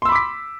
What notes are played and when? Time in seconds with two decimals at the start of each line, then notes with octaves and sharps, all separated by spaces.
0.02 C6
0.05 E6
0.09 B5
0.12 D6
0.15 B6